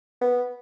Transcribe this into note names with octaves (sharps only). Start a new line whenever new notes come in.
B3